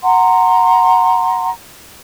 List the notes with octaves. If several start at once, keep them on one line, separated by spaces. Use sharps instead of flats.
F#5 A#5 C6